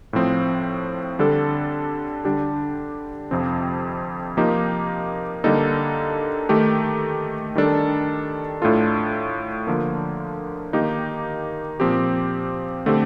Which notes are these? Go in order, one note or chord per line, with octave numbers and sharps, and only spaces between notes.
A2 F3 C4
D3 G3 D4 A4
D3 G3 D4 G4
F2 C3 F3 C4
F3 A#3 D#4 G4
D3 G3 A#3 D#4 A4
D#3 A3 D#4 G4
D#3 G3 D4 A4
A2 A3 D4 F4 A4
D3 F3 A#3
D#3 A#3 D#4 G4
A#2 F3 C4 G4
D3 A3 C4 G4